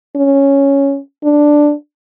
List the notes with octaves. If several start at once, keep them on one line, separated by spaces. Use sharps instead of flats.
C#4
D4